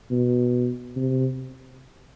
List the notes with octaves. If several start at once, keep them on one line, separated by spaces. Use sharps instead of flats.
B2
C3